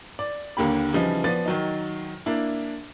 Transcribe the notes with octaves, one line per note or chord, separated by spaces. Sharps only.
D5
D#2 D3 A#3 G4 B5
C#3 E3 F3 G3 D#4
F3 B3 D5 A6
D#3 F#3 D#4
A#3 D4 E4